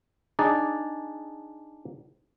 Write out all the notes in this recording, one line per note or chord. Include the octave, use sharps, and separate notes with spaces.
D4 D#4 G#4 D5